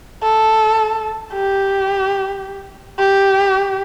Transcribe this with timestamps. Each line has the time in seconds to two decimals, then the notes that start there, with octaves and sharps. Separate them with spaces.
0.23 A4
1.33 G4
2.99 G4